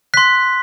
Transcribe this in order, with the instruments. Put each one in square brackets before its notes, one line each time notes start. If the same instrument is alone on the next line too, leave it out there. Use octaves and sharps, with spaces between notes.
[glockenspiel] C6 F#6 B6